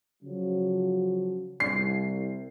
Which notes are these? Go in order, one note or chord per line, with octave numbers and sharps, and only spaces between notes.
C#3 F3 F#3
C2 C7